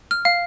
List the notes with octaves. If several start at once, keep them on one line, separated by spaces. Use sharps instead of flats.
F6
F5